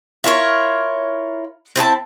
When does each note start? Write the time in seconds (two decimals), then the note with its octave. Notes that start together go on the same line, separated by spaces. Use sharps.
0.24 E4 F4 A#4 C#5
1.76 C4 E4 G#4 A5